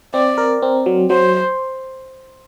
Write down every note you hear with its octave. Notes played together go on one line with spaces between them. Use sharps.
C4 D5
A#4
C4
F#3
F#3 C5